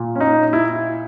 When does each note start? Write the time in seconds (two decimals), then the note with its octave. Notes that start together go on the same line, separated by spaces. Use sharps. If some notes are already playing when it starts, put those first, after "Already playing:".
Already playing: A#2
0.15 C#4
0.20 D#4
0.53 E4